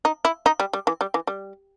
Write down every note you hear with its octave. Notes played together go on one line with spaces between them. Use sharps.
D#4
E4
D#4
G3
G3
E3
G3
E3
G3